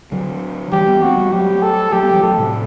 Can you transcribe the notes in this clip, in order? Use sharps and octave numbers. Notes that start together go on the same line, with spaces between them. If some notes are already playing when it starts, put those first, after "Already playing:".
D3 F#3
E3 G3 G4
G3 B3
A3 C4 F#4
G3 B3
F#3 A3 G4
A4
F#3 A3 G4
G3 B3
E3 G3
F#3 A3 A4
A2 C3